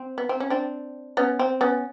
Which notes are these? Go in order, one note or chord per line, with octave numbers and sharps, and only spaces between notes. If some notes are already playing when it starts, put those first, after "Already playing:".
Already playing: C4
B3
C4
C#4
C4 D4
B3 C#4
C4
B3 C#4